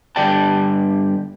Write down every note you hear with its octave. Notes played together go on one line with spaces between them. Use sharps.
G2 D3 G4 D5 G5 A5